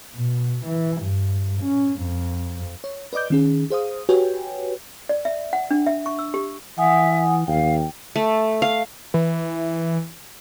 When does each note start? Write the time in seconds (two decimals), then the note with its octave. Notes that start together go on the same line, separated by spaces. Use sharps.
0.15 B2
0.66 E3
1.01 G2
1.62 C#4
2.00 F2
2.84 C#5
3.13 B4 D5 D#5 D6 G6
3.30 D#3 C#4 G#4
3.70 G#4 C5 F5 D#6
4.09 F#4 G4 B4 C#5 G5 G#5
5.09 D5
5.25 E5
5.53 F#5
5.71 D4
5.87 E5
6.06 C#6
6.19 E6
6.34 G4
6.78 E3 E5 F#5 G#5 D#6
7.47 D#2 F5 G5
8.16 A3
8.62 F5
9.14 E3